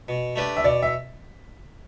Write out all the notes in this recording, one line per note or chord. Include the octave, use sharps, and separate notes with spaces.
B2
A3 D4 G4 B4
E5
B2 D5
E5